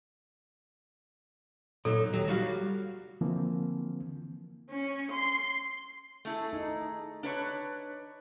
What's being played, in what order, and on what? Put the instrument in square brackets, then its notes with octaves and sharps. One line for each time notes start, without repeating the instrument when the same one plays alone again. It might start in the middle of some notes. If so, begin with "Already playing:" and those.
[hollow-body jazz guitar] A#2 F#3 D#4 [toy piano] A4
[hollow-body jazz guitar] D#2 F#3
G3 F#4 F5
[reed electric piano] D3 E3 F3 A#3 C4
[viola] C#4
C6
[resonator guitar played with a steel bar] A3 E4 G#4
[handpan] D#4
[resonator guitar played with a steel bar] D4 B4 C#5